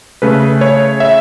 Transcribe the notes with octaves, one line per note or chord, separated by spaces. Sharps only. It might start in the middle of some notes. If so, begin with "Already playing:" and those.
C#3 A3 B4
C#5
E5